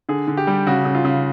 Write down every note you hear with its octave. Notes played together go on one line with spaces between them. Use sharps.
D3 G#4
D3
G4
G3
C#3 F#4
C#3
F4
C#3